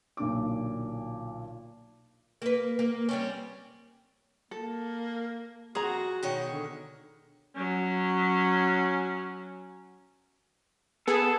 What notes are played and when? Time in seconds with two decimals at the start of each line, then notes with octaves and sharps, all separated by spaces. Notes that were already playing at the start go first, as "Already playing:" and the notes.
0.17 B1 A#2 D3 D6
2.42 A#3 B4
2.79 A#3
3.09 G3 C4 C#4
4.51 A#3 A4
5.75 F2 F#4 G#4 A#5
6.23 B2 D#3 C#5
6.51 D3
7.55 F#3 C#4
11.08 B3 G#4 A4